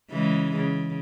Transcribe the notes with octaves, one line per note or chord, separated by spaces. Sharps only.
C#3 E3 G#3
C#3